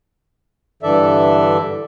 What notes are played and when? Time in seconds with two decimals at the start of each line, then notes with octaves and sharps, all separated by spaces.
0.83 G2 D3 E3 A4 D5 E5